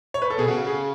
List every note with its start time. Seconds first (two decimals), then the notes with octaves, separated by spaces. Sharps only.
0.14 C#5
0.22 B4
0.30 A4
0.39 B2 G#4
0.48 C#3 F#4
0.67 G#4